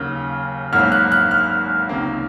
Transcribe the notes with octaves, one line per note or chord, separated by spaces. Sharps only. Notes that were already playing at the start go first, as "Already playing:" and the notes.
Already playing: D#2 C#3 F#3 A#3 F6
G#1 G#2 F#3 A#3 F6
F#6
F#6
F6
C#2 C3 D#3 A#3